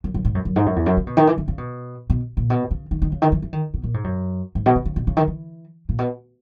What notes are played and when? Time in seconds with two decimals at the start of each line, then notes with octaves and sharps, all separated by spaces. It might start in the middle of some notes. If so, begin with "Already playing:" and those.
0.04 F#2
0.14 F#2
0.25 G#2
0.35 F#2
0.45 F#2
0.56 G#2
0.66 F#2
0.76 E2
0.86 F#2
0.97 C#3
1.07 B2
1.17 D#3
1.27 E3
1.38 D#3
1.48 C#3
1.58 B2
2.10 B2
2.37 A#2
2.50 B2
2.71 C#3
2.91 D#3
3.02 D#3
3.12 C#3
3.22 D#3
3.32 E3
3.42 E3
3.53 D#3
3.74 B2
3.84 A#2
3.94 G#2
4.04 F#2
4.55 G#2
4.66 B2
4.75 C#3
4.85 C#3
4.96 B2
5.07 C#3
5.17 D#3
5.27 E3
5.89 A#2
5.99 B2